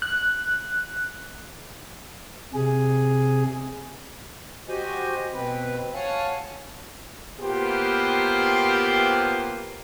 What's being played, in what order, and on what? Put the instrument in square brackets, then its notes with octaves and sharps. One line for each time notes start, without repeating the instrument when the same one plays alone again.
[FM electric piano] F#6
[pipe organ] C3 G#4
[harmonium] F#4 G4 C5 D#5 G#5
B2 C4 B4
C#5 F5 F#5 G#5 A5
[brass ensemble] A#3 B3 F4 G4 B4 C5